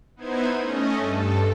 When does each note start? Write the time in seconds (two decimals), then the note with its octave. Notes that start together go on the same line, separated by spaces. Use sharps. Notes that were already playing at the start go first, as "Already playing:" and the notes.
0.16 B3 D#4 E4 C5 G#6
0.59 A3 C#4 D#5
0.97 G2 A4